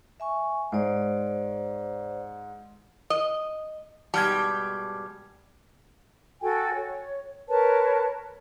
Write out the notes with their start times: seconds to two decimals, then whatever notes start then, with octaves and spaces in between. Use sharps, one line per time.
0.20 E5 G#5 C#6
0.72 G#2 C5 D5
3.10 D#5
4.14 G#2 B2 G3 A5 F6 G#6
6.41 F#4 A4 G5 G#5
6.74 C#5
7.48 A#4 B4 C#5 A5